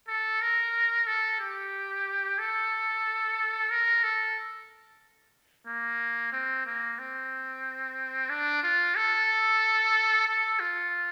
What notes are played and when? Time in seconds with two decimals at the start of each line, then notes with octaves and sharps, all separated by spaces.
0.08 A4
0.42 A#4
1.07 A4
1.40 G4
2.38 A4
3.71 A#4
4.03 A4
5.67 A#3
6.32 C4
6.66 A#3
6.99 C4
8.30 D4
8.63 F4
8.96 A4
10.27 A4
10.60 F4